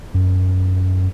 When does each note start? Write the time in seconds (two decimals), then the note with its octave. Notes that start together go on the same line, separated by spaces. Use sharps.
0.14 F#2